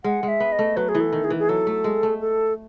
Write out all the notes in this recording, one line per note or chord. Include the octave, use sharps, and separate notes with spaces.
G#3 F#5
G#3
E5
B3
D#5
A3
F#3 B4
G#4
E3
A4
D#3
G#4
E3
G#4
F#3 A4
A3
G#3
A3
A4